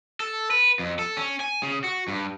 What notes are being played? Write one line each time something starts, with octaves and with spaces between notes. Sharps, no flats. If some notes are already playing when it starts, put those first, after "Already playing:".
A4
B4
F2
A4
C#4
G#5
C#3
F#4
G2